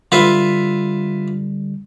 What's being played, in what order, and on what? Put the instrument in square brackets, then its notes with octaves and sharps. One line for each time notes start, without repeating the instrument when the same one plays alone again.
[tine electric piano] D3 G3 [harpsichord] F4 B4 E5